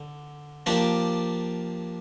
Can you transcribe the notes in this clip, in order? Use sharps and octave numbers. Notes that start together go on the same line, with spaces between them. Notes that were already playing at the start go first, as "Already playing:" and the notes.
Already playing: D3
F3 A#3 D4 G4 D5